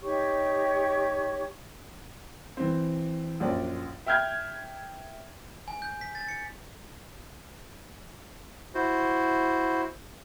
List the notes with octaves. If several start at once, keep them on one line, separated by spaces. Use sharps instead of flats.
D#4 G4 C#5 C#6
E3 C4
A#1 F#2 D5
E5 G5 F6 G6 G#6
G#5
G6
B6
A6
C#7
E4 F#4 C5